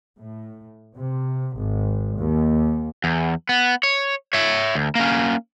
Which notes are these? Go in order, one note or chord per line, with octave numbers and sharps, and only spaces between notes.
A2
C3
G#1
D#2
E2
B3
C#5
C#5 E5
D2
A#3 C#4